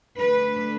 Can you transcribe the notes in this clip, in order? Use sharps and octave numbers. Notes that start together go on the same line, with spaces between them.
D3 A3 D4 B4